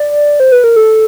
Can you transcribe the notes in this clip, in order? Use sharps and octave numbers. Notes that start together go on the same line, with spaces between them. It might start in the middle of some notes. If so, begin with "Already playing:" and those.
Already playing: D5
C5
B4
A#4
A4